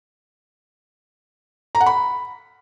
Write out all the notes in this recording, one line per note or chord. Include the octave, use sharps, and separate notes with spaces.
A#5
F#5
B5